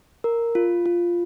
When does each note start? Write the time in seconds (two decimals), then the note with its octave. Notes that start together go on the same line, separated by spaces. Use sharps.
0.24 A#4
0.55 F4
0.86 F4